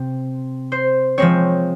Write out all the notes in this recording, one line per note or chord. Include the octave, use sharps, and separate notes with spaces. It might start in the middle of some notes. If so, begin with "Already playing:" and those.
Already playing: C3 C4
C5
F3 G#3 C4 C#5